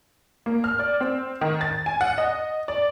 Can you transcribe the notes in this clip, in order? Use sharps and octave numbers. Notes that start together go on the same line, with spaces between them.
A#3
F6
D5
C4
D#3
A6
G#5
F#5
D#5
D5